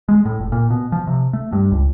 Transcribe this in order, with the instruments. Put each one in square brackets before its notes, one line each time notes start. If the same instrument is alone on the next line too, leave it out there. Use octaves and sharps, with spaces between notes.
[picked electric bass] G#3
A2
F1
A#2
B2
F3
C3
A3
G2
C#2